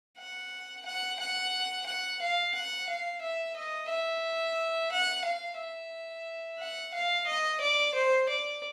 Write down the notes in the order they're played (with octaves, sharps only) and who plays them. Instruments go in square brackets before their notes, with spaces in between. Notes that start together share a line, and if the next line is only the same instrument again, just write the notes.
[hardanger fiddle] F#5
F#5
F#5
F#5
F5
F#5
F5
E5
D#5
E5
F#5
F5
E5
F#5
F5
D#5
D5
C5
D5